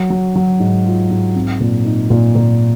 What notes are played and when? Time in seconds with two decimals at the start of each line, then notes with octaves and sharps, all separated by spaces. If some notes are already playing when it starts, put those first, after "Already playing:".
Already playing: F#3
0.10 F#3
0.36 F#3
0.60 G#2
0.86 F4
1.11 G#2
1.35 C4
1.61 A#2
1.85 D#4
2.10 A#2
2.35 A#2